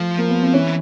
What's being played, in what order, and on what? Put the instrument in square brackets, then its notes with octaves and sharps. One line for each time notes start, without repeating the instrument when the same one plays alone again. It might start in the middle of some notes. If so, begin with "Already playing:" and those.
Already playing: [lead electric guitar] F3 [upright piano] A3
[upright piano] A#3
B3
C4
[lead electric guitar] E3 [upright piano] C#4